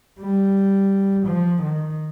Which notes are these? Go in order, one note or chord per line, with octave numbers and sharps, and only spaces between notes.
G3
F3
D#3